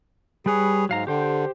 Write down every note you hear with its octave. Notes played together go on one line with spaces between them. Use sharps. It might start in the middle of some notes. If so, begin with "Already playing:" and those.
G3 G#4 B4 C#5
G#2 F#3 F5 A#5
D3 G4 C5 G5